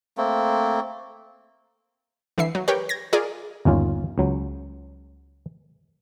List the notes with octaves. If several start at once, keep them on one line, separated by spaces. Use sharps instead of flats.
A3 A#3 C4
D3 E3 E5 C7
F#3
G4 A#4 B4 C#5
G#6 A#6
F4 G#4 A#4 D5
G1 D#2 C#4 F4
C#2 F#3